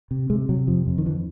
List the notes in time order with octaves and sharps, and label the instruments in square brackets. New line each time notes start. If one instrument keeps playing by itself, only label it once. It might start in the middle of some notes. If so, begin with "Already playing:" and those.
[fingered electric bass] C3
C3 G#3
C3 F#3
F2 F3
F2
D#3
D3 E3